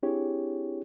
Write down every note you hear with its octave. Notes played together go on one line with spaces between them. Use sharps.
C4 D4 E4 G4 G#4 C#5